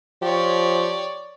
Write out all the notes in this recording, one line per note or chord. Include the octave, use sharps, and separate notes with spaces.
F3 G4 C#5 D5